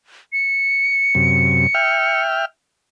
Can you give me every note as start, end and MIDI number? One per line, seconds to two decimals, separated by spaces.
0.33 2.21 97
1.15 1.67 42
1.15 1.67 48
1.75 2.45 76
1.75 2.45 79
1.75 2.45 89